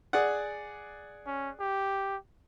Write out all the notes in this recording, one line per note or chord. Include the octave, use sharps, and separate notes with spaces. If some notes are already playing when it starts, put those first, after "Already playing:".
G#4 D5 F#5
C#4
G4